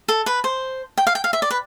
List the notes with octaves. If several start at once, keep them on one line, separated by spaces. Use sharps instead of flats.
A4
B4
C5
G5
F5
G5
F5
E5
D5
B4